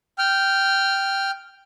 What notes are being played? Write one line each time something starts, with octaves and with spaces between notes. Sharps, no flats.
G5 F6